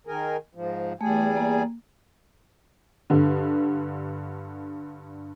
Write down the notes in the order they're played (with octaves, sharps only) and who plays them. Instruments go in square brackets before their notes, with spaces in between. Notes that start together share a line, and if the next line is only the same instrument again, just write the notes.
[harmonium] D#3 G#4 A#4
G#2 F3
[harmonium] E2 G3 G#4 [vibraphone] A3
[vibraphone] A#3
[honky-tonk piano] G2 D3